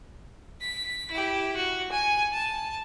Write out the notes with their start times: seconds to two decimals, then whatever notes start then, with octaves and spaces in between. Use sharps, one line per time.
0.61 B6
1.11 E4 G4
1.57 F#4
1.92 G#5
2.33 A5